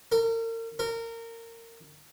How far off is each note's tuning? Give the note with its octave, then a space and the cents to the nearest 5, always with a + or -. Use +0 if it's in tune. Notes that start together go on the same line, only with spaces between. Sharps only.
A#4 -40
A#4 -25